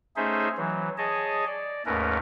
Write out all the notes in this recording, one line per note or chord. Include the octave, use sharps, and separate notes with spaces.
A3 C#4 D#4 G#4 C5 E5
E3 F#3
G#4 C#5 D#5 A5
D5
D#2 G#2 A3 C#4 A#4 B4